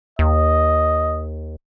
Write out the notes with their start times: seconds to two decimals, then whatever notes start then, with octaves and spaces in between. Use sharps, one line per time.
0.19 D#2 D#5